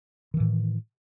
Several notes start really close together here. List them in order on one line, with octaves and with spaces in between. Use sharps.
D#3 E3 A2